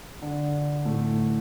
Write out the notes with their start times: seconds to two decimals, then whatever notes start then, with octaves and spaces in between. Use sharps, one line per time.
0.22 D3 D4
0.85 A2 A3